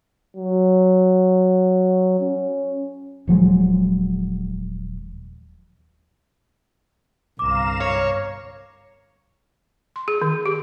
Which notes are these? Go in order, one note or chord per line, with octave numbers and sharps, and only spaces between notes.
F#3
C#4
D#1 F3 F#3 G#3
G1 C2 F5 A#5 D6 E7
C#5
C6
G#4
D#3
G4